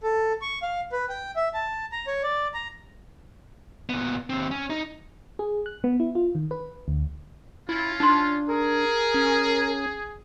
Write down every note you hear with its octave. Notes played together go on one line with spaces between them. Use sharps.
A4
C#6
F5
B4
G5
E5
A5
A#5
C#5
D5
A#5
A#2 B3
D#2 C4
C#4
D#4
G#4
F#6
B3
E4
F4
D#3
B4
D2
C#4 E4 F4
D4 D#4 C6
G#4 A#4
C#4